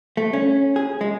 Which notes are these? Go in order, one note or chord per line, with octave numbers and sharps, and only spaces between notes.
A3
C#4
G#4
G#3